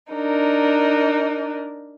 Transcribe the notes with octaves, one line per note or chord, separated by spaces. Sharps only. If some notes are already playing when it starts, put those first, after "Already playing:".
D4 D#4 A#4